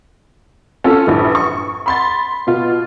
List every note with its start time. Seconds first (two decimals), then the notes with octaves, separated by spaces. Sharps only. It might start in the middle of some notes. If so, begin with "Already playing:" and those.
0.84 C#4 F4 A4
1.07 A#1 G2 E3
1.35 C#6
1.86 B5 C6 A6
2.47 B2 F4